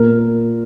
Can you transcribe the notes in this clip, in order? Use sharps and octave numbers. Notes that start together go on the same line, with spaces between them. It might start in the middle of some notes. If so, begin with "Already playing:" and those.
Already playing: A#2 A#4